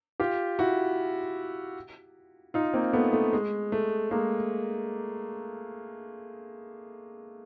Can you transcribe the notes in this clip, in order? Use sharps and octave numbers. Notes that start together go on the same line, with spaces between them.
F4 G4
E4 F#4
D#4 F4
A#3 C4
A3 B3
A3
G#3
A3
G#3 A#3